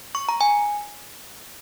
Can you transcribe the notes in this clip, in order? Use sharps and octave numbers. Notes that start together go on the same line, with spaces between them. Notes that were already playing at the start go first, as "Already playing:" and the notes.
C#6
A#5
G#5